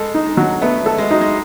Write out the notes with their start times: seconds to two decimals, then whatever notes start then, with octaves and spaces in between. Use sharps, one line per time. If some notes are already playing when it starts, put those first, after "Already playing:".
Already playing: G#3 A4
0.14 D#4
0.26 G#3
0.37 F#3
0.62 A3 B3
0.86 A4
0.98 G#3
1.10 F#3 D#4
1.21 G#3